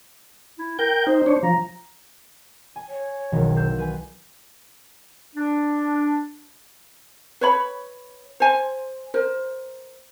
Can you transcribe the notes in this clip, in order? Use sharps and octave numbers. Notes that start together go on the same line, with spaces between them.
E4
A#4 G5 G6
D#4 C5
D4 C#5
F3 A#5
G#5
C#5
E1 B1 D#3
F5 E6 G6
B4 G#5
D4
B4 C#5 B5
C5 G#5
A#4 C5